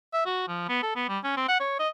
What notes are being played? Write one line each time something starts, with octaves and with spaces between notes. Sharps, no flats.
E5
F#4
F3
B3
A4
B3
G3
C#4
C4
F#5
C#5
D#5